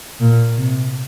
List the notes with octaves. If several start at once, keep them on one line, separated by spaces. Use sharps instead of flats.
A#2
C3